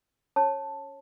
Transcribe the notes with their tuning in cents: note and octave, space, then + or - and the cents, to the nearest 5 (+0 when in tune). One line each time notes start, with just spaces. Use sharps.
C#4 +10 C#5 -20 A5 +0